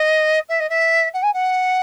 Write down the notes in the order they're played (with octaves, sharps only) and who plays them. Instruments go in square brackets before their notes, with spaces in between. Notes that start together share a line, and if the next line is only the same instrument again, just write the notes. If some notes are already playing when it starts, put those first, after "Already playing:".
Already playing: [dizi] D#5
E5
D#5
E5
F#5
G#5
F#5